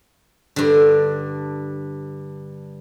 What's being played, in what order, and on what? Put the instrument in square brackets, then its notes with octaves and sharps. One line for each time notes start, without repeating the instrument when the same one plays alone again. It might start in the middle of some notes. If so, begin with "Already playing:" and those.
[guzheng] G2 D3